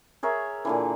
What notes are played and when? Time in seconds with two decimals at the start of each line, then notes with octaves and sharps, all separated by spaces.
0.23 G#4 A#4 C#5 E5
0.65 A#2 D3 E3